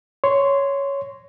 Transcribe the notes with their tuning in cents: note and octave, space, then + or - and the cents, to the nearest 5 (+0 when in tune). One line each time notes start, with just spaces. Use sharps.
C#5 +5 C6 -10